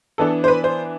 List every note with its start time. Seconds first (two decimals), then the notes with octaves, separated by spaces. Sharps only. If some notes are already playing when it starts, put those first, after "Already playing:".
0.18 E3 B3 D4 A4
0.44 C5
0.48 B4
0.64 C5